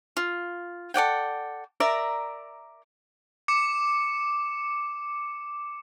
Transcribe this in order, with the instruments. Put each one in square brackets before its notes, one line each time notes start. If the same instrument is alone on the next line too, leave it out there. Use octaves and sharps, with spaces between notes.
[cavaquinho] F4
A4 D5 F#5 G5
A#4 D5 E5 A#5
[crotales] D6 C#7 E7